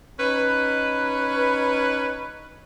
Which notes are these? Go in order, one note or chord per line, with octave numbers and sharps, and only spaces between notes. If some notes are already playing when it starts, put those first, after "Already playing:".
C#4 D#4 B4